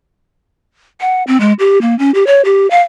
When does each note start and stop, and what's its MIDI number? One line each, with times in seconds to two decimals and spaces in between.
1.01 1.23 78
1.27 1.40 60
1.40 1.53 56
1.59 1.79 67
1.82 1.97 58
1.99 2.11 61
2.15 2.26 67
2.27 2.42 73
2.45 2.69 67
2.70 2.81 77